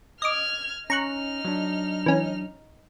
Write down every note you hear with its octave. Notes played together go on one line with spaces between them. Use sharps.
D#5 D6 F6 G#6
C#4 D#4 A#5 C#6 F6 F#6
F#3 D4
E3 C#4